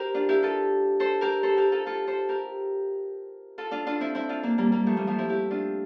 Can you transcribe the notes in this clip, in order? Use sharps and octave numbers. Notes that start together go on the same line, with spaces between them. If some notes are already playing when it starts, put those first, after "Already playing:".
Already playing: G4 A#4 C5
D4 F4
E4 G4
F4 A4
A4 C5
G4 A#4
A4 C5
G4 A#4
F4 A4
F4 A4
A4 C5
G4 A#4
F4 A4
D4 F4
D4 F4
C4 E4
C4 E4
D4 F4
A#3 D4
G3 A#3
G3 A#3
F3 A3
E3 G3
F3 A3
C4 E4
E4 G4
D4 F4